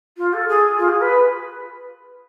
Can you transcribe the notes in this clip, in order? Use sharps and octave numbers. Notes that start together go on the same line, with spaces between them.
F4
A4
G#4
F4
G#4
B4